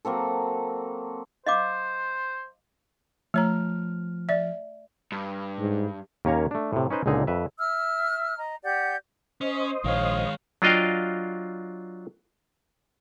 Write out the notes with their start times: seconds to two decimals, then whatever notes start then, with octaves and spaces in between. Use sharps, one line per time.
0.05 F#3 A#3 C4 A4
1.47 C5 D#5 F5 D6
3.34 F3 A3 C#5 A#5 F6
4.29 D5 E5
5.12 G2
5.58 G#2
6.25 D#2 A#3 C#4 C#5 A#5
6.51 A3 D4
6.73 A2 C3
6.90 C#4 D#4 B4 C5
7.06 C#2 A#2 D3 D#4 G#4
7.27 F2 B4 E5
7.58 E5 E6 F6
8.37 D#5 A#5
8.63 G4 D5 F#5 G6
9.41 C#4 C5 D#5
9.84 A#1 D#3 G#3 C#5 F5
10.62 F#3 D4 F4 D#5 F5 G5